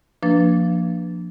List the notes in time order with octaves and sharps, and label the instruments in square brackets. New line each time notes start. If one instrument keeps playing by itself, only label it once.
[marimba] F3 A#3 D4 B4 A6